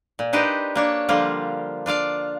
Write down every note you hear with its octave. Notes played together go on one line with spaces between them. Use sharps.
A#2
D4 D#4 G4 B4 C5 D#5
A#3 D4 C#5
D3 F3 G3 A#3 F4
D4 F4 D5 F5